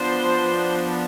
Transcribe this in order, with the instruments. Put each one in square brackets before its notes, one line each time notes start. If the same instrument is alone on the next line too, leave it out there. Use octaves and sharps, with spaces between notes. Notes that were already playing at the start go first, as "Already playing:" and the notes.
Already playing: [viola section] F3 B3 D4 C5